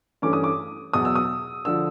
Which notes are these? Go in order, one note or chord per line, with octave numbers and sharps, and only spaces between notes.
G2 E3 A3 C#4 D6
D#6
D6
E2 B2 F#3 D#6
E6
D#6
D3 F3 E6